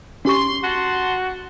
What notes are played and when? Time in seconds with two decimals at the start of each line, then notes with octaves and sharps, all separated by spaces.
0.25 C#4 G4 C6 C#6
0.63 F#4 F#5 A5 C6